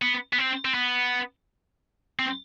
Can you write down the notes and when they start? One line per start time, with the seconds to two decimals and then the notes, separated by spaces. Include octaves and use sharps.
0.02 B3
0.33 B3
0.38 C4
0.65 C4
0.74 B3
2.19 C4